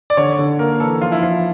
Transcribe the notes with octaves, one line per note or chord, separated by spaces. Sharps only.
D5
D3 C#5
D3
A#3 A#4
E3 A4
F3 F4
E4
F3 F4